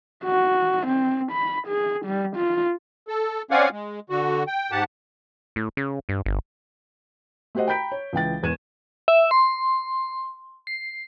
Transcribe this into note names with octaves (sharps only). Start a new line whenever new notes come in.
F#4
C4
B5
G#4
G3
F4
A4
C4 C#4 D5 F5 F#5 G#5
G#3
D3 F#4
G5
G#2 G4 F#5 A5
A2
C#3
G2
G1
A3 F#4 G4 C5 D#5 F#5
G5 A#5 B5 G6 B6 D7
C#5
C#2 E3 G5 A6
E1 E2 G#6 D#7 E7
E5
C6
C7